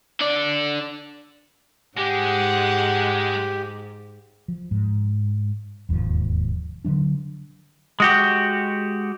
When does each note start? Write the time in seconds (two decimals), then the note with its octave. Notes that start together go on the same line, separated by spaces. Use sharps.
0.21 D3 D5
1.98 G#2 G#3 G4 F#5
4.48 F3
4.71 G#2
5.89 E1 D#2 G#2 F3
6.85 D3 F3 F#3 D4
8.00 G#3 F#4 G4